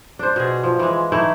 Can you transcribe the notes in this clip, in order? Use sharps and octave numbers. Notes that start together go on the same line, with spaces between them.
D4 C5
B2 G#4
F3
E3 G#3
E3 A3 D#4 E4